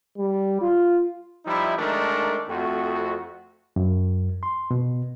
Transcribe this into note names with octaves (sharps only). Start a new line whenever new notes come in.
G3
F4
F3 G3 D#4 E4
D#3 G#3 A3 D4 D#4 A#4
F2 A3 F#4
F#2
C6
B2